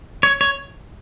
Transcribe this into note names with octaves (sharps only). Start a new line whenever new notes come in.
C#5
C#5